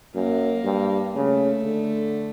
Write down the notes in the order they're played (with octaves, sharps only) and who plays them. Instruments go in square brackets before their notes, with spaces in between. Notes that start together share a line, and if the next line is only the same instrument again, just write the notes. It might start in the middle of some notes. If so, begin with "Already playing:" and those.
[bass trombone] F#2 [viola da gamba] A#3
[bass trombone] G2
[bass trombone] C#3 [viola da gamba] A3
[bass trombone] D3